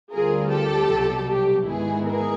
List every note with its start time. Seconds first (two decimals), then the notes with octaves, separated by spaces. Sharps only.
0.12 D2 D3 G3 C4 F4 G#4 A#4
0.51 G4 A4
0.90 C2 B2 F#3
1.29 G4
1.67 G#2 D#3 G#3 B3 E4 G#4
2.06 G#4 A#4